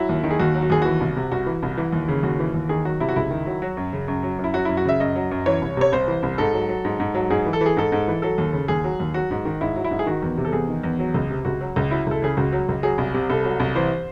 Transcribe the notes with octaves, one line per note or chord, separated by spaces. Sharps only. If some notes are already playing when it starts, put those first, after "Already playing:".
Already playing: F#3 E4
D#2
D#3
G#4
D#2 F#4
F#3
F#4
D#2 G#4
E3 F#4
C2
C3
C2 F#4
E3
C2
E3
D#2
C#3
D#2 F#4
E3
D#2
D#3 G#4
F#3 F#4
C3 E4
F#4
C#2 E4
D#3
F#3
F#3 F#4
F#2
C#3
F#2
F#3
F#2
E4
F#3 F#4
F#2 E4
F#4
C#3 E5
F#2 D#5
F#3
F#2
E3 C#5
C2
C3 C#5
C2 C5
E3
C2
G#2 A4
F#3
F#3
G#2
G#2
F#3
G#2 G#4
E3
A4
E3
G#4
G#2 A4
G#2
E3
F#3 A4
D#2
C#3
D#2 G#4
F#3
D#2
F#3 F#4
G#2
D#3
G#2 E4
F#3
E4
G#2
G#4
D#3 F#4
E2
C3
A4
E2 G#4
D#3
E2
F#3
C#2
C3
C#2 F#4
F#3
C#2
F#3 E4
C#2 A4
C#3 G#4
C#2 F#4
F#3
C#2
F#3 G#4
C2
C3
C2 A4
F#3
C2
E3 C5